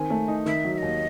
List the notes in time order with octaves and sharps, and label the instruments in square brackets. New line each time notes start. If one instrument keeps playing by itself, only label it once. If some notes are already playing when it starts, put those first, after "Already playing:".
Already playing: [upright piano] D#3 C4 [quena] G#5
[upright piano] A3
D#4
[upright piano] D#3 [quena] E5
[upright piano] F#3
[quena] E5
[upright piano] D#2 [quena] D#5